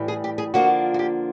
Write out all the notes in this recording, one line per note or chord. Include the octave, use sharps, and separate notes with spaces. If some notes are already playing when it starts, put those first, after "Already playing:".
Already playing: A2 E3 G3
G#4
G4
G#4
D3 F3 A#3 D4 F4 F#4
F#4
G4